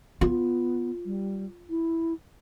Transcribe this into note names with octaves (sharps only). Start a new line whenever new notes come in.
B3 F4
G3
E4